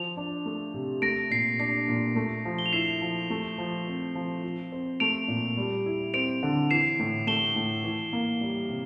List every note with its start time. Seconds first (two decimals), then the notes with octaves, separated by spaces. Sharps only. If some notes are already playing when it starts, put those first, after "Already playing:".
Already playing: F3 F7
0.17 D4
0.46 A3
0.74 C3
1.02 A3 A#6 D7
1.30 A#2 C7
1.59 D4 C7
1.88 A#2
2.16 A3
2.45 F3
2.59 G7
2.66 F7
2.73 E4 C7 E7
3.01 F3
3.30 A3
3.58 F3
3.87 C4
4.15 F3
4.43 F3
4.72 C4
5.00 A3 D7 F7
5.28 A#2
5.57 G3
5.86 E4
6.14 C4 D7 F7
6.43 D3
6.70 E3 C7 E7
7.00 A2
7.27 A3 E7 G7
7.56 A2
7.84 E3
8.13 A#3
8.41 G3
8.69 C3